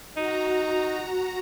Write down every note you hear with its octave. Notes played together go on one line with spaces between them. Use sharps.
D#4 F#4 A#5